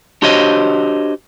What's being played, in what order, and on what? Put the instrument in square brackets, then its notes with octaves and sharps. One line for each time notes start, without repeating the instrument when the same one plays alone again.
[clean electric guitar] D4 F#4 G4 C5 C#5 D#5